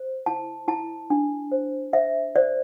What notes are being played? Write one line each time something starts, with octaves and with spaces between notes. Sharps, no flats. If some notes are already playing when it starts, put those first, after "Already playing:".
Already playing: C5
E4 A5
E4 A5
D4
C5
C5 E5
C5 D5